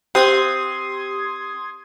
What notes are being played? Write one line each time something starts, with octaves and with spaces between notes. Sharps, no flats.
C4 G4 C6 D#6 G#6